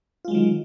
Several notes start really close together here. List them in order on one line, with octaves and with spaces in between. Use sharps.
F4 G#3 F#3 D#3